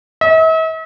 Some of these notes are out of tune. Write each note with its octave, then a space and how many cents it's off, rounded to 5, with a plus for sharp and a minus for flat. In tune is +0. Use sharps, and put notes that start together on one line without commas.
E5 -45